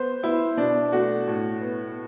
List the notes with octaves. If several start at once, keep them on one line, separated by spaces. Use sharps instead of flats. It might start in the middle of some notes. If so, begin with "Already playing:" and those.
Already playing: B3 C5
B3 E4
B2 D4
A3 F#4
A2
B3